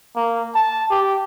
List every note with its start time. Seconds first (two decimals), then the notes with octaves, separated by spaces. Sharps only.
0.16 A#3
0.55 A5
0.91 G4